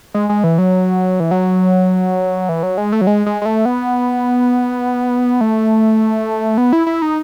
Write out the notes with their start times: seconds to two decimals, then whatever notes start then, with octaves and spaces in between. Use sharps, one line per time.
0.14 G#3
0.29 G#3
0.44 E3
0.58 F#3
1.20 E3
1.31 F#3
2.49 E3
2.63 F#3
2.78 G#3
2.92 A3
3.01 F#3
3.07 G#3
3.26 G#3
3.42 G#3
3.45 A3
3.65 B3
5.41 A3
6.58 B3
6.73 E4
6.87 E4
7.02 D#4